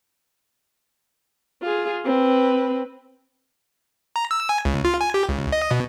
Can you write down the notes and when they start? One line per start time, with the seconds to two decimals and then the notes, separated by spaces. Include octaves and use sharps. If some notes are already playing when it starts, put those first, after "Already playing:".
1.62 F4 G#4
2.05 C4 B4
4.16 A#5
4.31 E6
4.49 G#5
4.65 C#2
4.85 F4
5.01 G#5
5.14 G4
5.29 C#2
5.52 D#5
5.71 B2